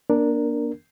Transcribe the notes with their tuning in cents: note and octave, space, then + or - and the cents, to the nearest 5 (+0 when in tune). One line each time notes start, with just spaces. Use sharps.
A#3 +40 D4 +0 A#4 +0